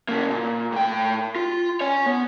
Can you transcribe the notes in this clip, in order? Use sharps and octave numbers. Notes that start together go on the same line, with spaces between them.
C#3 A#3
A#2
A2 G5
F4
C#5 G#5
B3